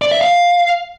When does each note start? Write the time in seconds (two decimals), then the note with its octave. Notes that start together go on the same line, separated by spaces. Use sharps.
0.02 D5
0.11 E5
0.21 F5